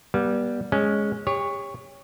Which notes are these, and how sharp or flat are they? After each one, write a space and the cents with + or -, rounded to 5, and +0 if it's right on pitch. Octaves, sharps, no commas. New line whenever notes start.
G3 +0 B3 -35
G#3 +0 C#4 +0
G4 +35 C#5 +0